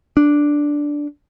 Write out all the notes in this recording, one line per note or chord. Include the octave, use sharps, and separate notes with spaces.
D4